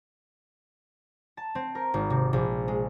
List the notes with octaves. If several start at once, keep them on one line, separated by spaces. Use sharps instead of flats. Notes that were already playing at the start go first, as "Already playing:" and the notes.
A5
C4
A#4
G#1
C3
A#1
G#3